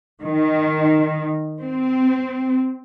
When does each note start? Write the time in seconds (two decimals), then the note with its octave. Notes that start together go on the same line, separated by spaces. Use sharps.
0.22 D#3
1.62 C4